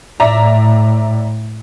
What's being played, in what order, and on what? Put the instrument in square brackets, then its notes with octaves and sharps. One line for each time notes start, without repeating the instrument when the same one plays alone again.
[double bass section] A2 [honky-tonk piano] D5 E5 A#5